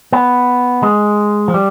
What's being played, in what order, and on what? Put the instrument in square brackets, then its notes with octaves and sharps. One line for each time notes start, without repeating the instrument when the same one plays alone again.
[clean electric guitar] B3
G#3
F3
G3